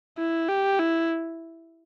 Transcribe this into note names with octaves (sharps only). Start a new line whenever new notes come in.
E4
G4
E4